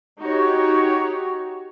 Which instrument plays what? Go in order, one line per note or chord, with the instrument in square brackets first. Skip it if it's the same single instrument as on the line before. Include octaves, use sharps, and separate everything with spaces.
[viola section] D#4 F#4 G4 C#5